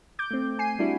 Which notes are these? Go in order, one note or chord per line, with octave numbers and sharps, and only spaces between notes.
D6 G6
A3 C4
G#5 C7 D#7
G3 D4 E4 F#4